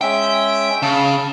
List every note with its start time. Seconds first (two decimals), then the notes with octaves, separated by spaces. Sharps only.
0.01 G#3 C#4 E5 G5
0.82 C#3 A5